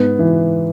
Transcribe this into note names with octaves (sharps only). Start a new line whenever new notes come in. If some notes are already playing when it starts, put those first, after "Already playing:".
Already playing: G#2 B3
E3